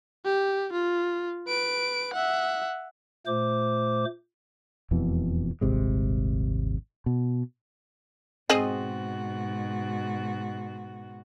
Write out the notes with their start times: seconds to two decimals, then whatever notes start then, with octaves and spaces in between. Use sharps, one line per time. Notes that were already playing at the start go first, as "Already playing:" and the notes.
0.25 G4
0.73 F4
1.48 B4 D7
2.14 E5 F#5
3.27 A#2 A3 C5 D6
4.91 E1 F2 B2 E3
5.61 D#1 G#1 C3 G#3
7.06 B2
8.50 G#2 B2 C4 F#4 G#4 D#5